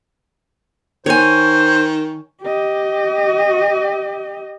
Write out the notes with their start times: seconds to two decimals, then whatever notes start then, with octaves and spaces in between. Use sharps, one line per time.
1.06 D#3 C5 C#5 G#5
2.42 G4 D#5